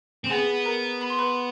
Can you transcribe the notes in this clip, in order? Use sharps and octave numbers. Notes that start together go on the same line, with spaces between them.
C4
B3 G#4 G#5
A#4 A#5
B5
C6
B4 B5